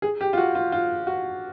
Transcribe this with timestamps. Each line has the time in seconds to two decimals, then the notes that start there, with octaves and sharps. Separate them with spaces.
0.02 G#4
0.21 G4
0.33 F4
0.38 F#4
0.55 F4
0.72 F4
1.07 F#4